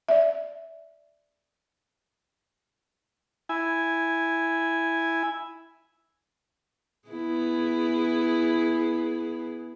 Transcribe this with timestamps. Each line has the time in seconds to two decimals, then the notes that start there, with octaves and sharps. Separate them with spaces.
0.08 D5 E5
3.49 E4 G#5
7.09 B3 E4 G#4